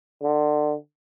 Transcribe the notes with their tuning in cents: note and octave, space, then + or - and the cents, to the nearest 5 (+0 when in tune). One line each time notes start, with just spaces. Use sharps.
D3 +30